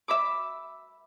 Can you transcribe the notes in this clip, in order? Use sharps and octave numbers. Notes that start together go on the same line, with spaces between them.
E5 B5 D6